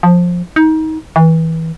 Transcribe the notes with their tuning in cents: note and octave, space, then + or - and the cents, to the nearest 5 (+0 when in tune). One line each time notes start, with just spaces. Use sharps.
F3 +15
D#4 +25
E3 -25